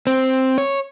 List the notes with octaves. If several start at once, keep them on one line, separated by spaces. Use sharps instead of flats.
C4
C#5